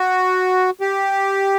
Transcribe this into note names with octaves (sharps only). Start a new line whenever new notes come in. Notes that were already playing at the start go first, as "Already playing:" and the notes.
Already playing: F#4
G4